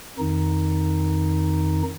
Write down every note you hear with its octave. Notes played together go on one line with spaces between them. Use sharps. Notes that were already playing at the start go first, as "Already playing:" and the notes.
F2 D#3 D#4